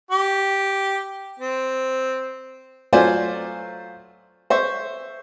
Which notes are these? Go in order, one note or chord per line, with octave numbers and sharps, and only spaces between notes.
G4
C4
F#3 A3 F4 C5 D5 G#5
C5 E5 C#6